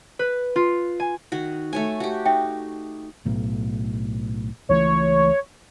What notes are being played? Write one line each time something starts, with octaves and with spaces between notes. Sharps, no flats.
B4
F4
G#5
D#3 F#4
A3 C#5 G#5
F#4 G4
D#4 E5 G5
B1 A2
C#2 E3 A3 C#5